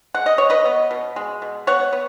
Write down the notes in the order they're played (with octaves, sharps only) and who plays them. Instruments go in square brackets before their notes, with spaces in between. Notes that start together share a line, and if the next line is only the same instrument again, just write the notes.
[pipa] G#3 F#5
D#5
B2 C#5
B4 D#5
B3
B2
G#3
B2
B3 C#5 F#5
B3